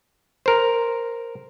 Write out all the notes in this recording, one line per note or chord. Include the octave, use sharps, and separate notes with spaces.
A#4 C5